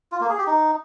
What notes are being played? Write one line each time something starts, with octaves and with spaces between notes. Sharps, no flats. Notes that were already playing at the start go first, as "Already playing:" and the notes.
F4
A#3
G#4
G4
D#4